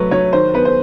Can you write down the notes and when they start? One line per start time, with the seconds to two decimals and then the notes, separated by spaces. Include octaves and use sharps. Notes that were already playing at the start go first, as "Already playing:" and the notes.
Already playing: F#3 A3 B4
0.11 F#3 C#5
0.33 D#3 C5
0.54 B3 B4
0.65 C5